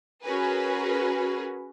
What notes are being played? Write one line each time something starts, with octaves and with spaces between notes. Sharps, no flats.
C#4 F#4 G#4 A#4 B4